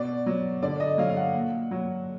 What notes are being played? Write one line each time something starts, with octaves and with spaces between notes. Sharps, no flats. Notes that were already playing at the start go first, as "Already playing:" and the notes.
Already playing: B2 D5
F#3
D3 D5
D#5
F#3 F5
F5
F#5
A#2
F#3